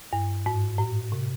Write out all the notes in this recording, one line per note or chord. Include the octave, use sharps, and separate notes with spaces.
G2
G#2
A2
C3